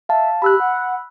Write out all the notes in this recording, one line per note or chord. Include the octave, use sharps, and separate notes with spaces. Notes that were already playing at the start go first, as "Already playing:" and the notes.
E5 F5 A5
G4 B5 E6 F#6
F#5